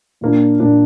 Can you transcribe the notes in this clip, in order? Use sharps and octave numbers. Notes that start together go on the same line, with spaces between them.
A#2 A#3 D4
A#2 A#3 D4